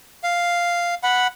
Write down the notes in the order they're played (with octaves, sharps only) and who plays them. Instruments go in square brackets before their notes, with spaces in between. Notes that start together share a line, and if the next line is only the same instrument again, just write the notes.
[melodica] F5
F#5 B5